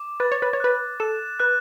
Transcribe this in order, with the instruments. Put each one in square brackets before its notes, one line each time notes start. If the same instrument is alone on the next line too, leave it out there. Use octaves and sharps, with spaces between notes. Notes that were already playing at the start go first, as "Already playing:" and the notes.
Already playing: [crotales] D6
[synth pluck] B4 [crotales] A6
[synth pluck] C#5
B4
C#5
[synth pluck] B4 [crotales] F#6
[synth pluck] A4 [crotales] E7
[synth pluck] B4 [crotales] F#6